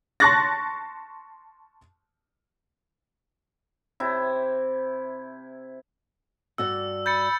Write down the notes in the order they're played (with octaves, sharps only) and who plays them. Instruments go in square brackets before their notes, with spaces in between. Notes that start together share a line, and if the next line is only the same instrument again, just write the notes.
[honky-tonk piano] A5 C6 C#6 F#6 A6 A#6
[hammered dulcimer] C3 E4
[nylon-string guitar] G2 F#4 D5 [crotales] E6
[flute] B5 [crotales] G6 A6 C#7